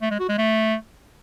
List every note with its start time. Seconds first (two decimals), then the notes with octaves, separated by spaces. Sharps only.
0.01 A3
0.10 G#3
0.20 F#4
0.29 G#3
0.38 A3